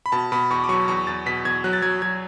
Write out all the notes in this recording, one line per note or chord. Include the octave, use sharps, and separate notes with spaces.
B5
B2 A5
B2 B5
E2 C#6
D6
F#3 C#6
E2 C#6
E2 A6
B2 B6
E2 G#6
F#3 F#6
A6
F#3 G#6
F#3 G#6